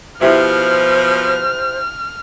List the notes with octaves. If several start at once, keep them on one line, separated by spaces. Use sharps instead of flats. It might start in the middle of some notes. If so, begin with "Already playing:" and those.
B2 F3 E4 G4 C5 E5 F6